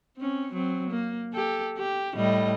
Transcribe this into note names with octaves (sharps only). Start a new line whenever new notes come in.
C4 C#4
F#3 C4
A#3
G4 A4
G4
A2 G3 D#5